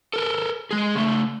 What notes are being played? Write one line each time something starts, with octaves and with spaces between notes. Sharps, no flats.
A4 A#4
G#3 G#4
C#3 A3